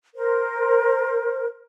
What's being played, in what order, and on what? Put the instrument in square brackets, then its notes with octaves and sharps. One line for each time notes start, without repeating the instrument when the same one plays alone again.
[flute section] A#4 C5